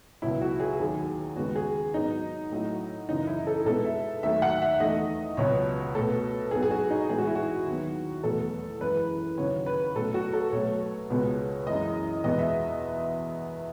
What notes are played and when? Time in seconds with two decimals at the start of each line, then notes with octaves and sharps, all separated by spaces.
0.22 C#2 B2 F#3 E4
0.41 F#4
0.60 G#4
0.80 D#2 D#3 F#3 G#4
1.36 D#2 C#3 G#3 B3 F#4
1.56 G#4
1.94 G#2 F#3 B3 D#4
2.52 A2 F#3 A3
3.09 F#2 C#3 E3 D#4
3.27 E4
3.47 A4
3.65 B2 G#3 B3 A4
3.85 E5
4.23 D#2 D#3 F#3 A3 E5
4.42 F#5
4.62 E5
4.80 E2 D#3 A3 D#5
5.37 C#2 B2 F#3 B3 C#5
5.95 B2 A3 A4
6.51 G#2 F#3 B3 G#4
6.63 G#4
6.71 F#4
6.90 D#4
7.09 A2 E3 G#3 B3 G#4
7.18 F#4
7.27 E4
7.35 F#4
7.66 D#2 D#3 F#3 B3
8.24 E2 B2 F#3 A3 A4
8.81 F#2 E3 G#3 B4
9.37 D#2 C#3 F#3 C#5
9.66 B4
9.96 B2 F#3 A3 A4
10.14 F#4
10.33 A4
10.52 B2 F#3 A3 C#5
11.10 C#2 B2 G#3 B3
11.66 F#2 E3 G#3 D#5
12.24 E2 B2 G#3 B3 D#5
12.39 E5